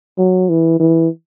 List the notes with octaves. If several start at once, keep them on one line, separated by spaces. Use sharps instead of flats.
F#3
E3
E3